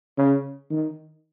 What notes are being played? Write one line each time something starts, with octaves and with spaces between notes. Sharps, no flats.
C#3
D#3